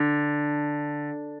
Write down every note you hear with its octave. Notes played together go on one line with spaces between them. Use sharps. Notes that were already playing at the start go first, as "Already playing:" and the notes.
Already playing: D3